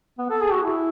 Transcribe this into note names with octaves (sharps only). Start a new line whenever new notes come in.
B3
A4
G#4
F#4
E4